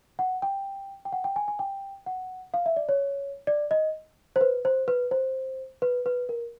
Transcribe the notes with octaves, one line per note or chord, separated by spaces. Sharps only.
F#5
G5
G5
F#5
G5
G#5
G#5
G5
F#5
F5
E5
D5
C#5
D5
D#5
C5
B4
C5
B4
C5
B4
B4
A#4